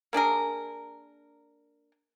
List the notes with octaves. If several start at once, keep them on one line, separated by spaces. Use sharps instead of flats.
A#3 D4 G#4 A#4